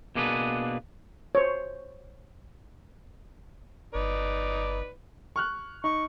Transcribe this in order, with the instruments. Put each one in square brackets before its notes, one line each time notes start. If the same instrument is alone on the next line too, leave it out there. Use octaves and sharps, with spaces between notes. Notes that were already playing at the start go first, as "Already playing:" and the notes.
[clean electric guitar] B2 A#3 D4 G#4 A#4 B4
[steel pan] C5 C#5
[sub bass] G1 [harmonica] D#4 B4 D5
[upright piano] C#6 F6 F#6
[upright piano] D#4 [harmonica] C#6